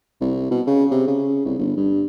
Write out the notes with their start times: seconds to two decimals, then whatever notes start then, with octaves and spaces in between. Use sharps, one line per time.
0.21 C2
0.51 B2
0.67 C#3
0.91 C3
1.08 C#3
1.45 C2
1.59 G1
1.77 G2